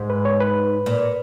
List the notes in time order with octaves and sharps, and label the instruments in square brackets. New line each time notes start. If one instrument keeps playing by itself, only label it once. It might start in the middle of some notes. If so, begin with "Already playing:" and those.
Already playing: [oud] G#2
[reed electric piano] B4
C#5
B4
[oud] A#2